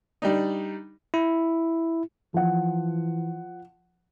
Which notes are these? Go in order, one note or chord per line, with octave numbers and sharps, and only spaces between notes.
G3 D4 D#4
E4
E3 F3 F#5